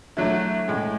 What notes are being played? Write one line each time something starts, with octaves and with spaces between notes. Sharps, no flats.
D3 F#3 A3 E4
A2 G#3